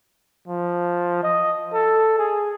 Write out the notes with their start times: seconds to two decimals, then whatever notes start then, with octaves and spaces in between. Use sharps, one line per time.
0.48 F3
1.23 D#5
1.73 A4
2.18 G#4